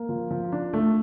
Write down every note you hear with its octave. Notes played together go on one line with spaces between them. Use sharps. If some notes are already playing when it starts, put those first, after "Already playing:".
Already playing: A#3
F3
F3
D4
A3